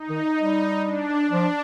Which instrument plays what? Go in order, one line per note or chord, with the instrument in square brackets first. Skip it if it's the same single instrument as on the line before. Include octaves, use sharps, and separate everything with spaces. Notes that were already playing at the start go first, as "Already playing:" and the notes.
Already playing: [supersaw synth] D#4
[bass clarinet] D#3
G3
[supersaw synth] D4
[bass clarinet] F3 [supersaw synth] D4